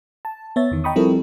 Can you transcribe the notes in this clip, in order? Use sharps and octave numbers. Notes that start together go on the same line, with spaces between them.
A5
B3 C#5 E5 A6
E2 D#3
D#5 G5 A#5 B5 C#6 D#6
F3 G3 C4 E4 A4 A#4